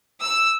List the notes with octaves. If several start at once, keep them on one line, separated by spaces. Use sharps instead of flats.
E6